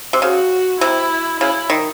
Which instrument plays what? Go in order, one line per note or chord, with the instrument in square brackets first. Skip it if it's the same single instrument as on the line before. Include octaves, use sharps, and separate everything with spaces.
[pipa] C3
[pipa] C#3 [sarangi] F#4
[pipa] C3 [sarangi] E4
[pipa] C#3 [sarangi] E4
[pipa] D#3